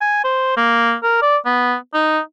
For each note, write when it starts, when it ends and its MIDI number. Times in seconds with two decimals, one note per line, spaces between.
0.01 0.23 80
0.24 0.55 72
0.57 0.95 58
1.03 1.19 70
1.22 1.37 74
1.46 1.75 59
1.94 2.19 63